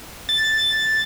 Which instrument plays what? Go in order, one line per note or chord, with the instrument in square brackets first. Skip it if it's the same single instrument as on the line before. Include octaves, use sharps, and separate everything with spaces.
[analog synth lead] A6